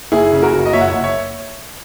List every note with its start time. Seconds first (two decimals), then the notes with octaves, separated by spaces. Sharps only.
0.12 F#1 E4 G#4
0.32 C#3
0.42 F#4 A#4
0.52 F#1
0.66 D#5
0.73 F#1 C#5 E5
0.81 F#5
0.88 F#1 C#5 E5
1.04 C#5 E5